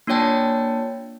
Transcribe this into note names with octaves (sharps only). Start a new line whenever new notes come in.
A#3 D4 F4 C#5 G5 A5